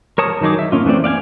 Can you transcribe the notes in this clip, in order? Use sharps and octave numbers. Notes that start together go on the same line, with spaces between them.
A#4 C#5 A5 D#6
D#3 F#3 D#4 G#4 D6
E5
A#3 C#4 F4
E3 A3 C4 D5
D5 F5 G5 G#5